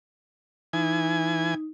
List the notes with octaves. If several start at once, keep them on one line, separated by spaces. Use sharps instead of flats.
E3 D#4 G#5